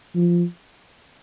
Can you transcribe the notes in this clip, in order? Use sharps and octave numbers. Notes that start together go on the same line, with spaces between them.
F3